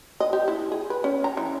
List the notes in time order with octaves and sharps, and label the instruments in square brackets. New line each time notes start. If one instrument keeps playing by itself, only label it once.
[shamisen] D#5
G4
E4
G#4
B4
C#4
A#5
E3